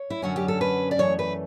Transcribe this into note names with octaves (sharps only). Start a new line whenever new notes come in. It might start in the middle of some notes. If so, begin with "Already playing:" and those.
Already playing: C#5
E4
F#2 D3 F#3 C#4 F#4
G4
A4
B4
D5
F#2 E3 A3 C#5
B4